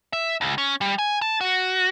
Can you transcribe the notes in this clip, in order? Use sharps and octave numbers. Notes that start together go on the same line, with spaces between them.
E5
C#2
C#4
G3
G#5
A5
F#4